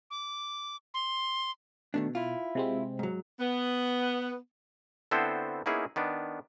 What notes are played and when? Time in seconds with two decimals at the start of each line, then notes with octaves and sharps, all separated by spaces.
0.11 D6
0.94 C6
1.94 B2 D#3 A3 D4
2.15 E4 F4
2.55 C3 G#3 C4
2.99 G#2 F#3
3.40 B3
5.11 D3 B3 C4 E4 A4 C5
5.66 A#3 B3 C#4 D#4 E4 G#4
5.96 D#3 B3 D4